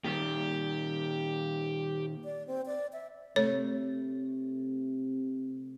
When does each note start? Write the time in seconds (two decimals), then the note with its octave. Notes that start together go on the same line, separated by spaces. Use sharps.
0.04 A#2 D#3 G3 G4
2.25 D5
2.47 C4
2.66 D5
2.93 E5
3.36 C3 A3 C#5